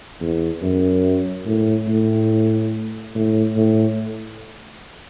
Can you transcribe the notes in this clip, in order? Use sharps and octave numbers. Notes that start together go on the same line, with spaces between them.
E2
F#2
A2
A2
A2
A2